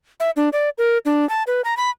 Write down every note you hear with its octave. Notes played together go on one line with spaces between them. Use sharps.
E5
D4
D5
A#4
D4
A5
B4
A#5
B5